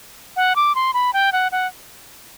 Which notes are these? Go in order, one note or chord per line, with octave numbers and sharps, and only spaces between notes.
F#5
D6
C6
B5
G5
F#5
F#5